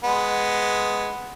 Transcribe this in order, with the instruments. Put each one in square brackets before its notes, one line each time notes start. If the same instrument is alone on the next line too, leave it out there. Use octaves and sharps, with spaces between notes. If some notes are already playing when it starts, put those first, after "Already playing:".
[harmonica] G#3 B3